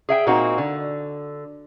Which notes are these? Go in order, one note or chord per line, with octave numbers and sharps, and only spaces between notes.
G#4 E5 G5
A#2 A#3 C4 D#4 F#4
D3